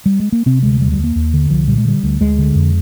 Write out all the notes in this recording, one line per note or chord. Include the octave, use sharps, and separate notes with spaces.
G3
G#3
A#3
C3 C4
D2 G#3
D#2 G3
G3
D#2
A#3
D#2
D3
C2 F3
A#2 G3
G#3
D3 G3
D2
D2 G#3
D3
F2